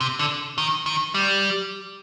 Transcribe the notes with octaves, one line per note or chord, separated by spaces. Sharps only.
C3
D3
D#3
D#3
G3